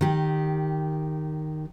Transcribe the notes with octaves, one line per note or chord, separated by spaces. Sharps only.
D#3 G4